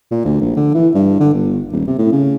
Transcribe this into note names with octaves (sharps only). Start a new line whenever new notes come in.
A#2
D2
A#1
D3
E3
G2
D3
G1
D#1
C3
A2
C#3